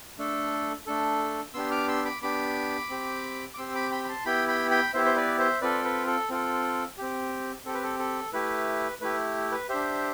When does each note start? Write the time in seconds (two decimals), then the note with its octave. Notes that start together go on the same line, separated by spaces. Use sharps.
0.18 A3 D4 A4
0.87 A3 D4 A4
1.54 B3 D4 G4 C6 E6
1.71 D6 F6
1.88 C6 E6
2.05 B5 D6
2.22 B3 D4 G4 B5 D6
2.90 C4 G4
3.54 D6
3.58 C4 G4 C6 E6
3.74 B5 D6
3.91 G5 B5
4.04 B5
4.08 A5 C6
4.25 B3 E4 G4 G5 B5
4.48 G5 B5
4.71 G5 B5
4.93 B3 E4 G4 C5 E5
5.05 C5
5.16 B4 D5
5.39 C5 E5
5.61 C4 F4 A4 B4 D5
5.84 B4
6.07 A4
6.29 C4 F4 A4
6.98 C4 G4
7.65 C4 G4 A4
7.74 B4
7.83 A4
7.99 A4
8.33 A3 E4 G4 B4
9.01 A3 E4 G4 B4
9.52 B4
9.69 D4 G4 C5 E5